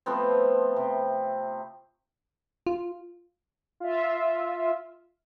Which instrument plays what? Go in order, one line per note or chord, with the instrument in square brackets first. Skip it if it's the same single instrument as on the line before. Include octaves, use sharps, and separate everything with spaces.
[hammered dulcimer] F3 A3 B3 C4
C3
[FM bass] F4
[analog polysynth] F4 E5